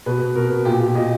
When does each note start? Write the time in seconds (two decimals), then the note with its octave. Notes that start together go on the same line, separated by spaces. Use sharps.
0.06 B2 B4
0.21 B2
0.35 B2 A#4
0.51 B2
0.65 A#2 G4
0.80 A#2
0.95 A#2 D#5